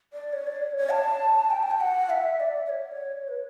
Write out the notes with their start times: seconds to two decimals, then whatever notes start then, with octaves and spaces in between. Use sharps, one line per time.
0.13 D5
0.33 C#5
0.47 D5
0.62 C#5
0.77 C#5
0.91 A5
1.51 G5
1.62 A5
1.71 G5
1.80 F#5
2.10 E5
2.40 D5
2.65 D5
2.69 C#5
3.28 B4